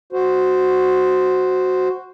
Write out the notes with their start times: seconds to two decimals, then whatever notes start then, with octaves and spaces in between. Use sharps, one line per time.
0.13 F#4 C5